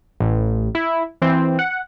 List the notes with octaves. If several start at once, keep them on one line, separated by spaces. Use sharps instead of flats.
A1
E4
E3 C4
F#5